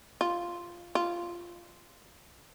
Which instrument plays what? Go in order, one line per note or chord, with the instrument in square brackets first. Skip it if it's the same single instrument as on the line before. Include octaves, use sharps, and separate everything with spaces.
[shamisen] F4
F4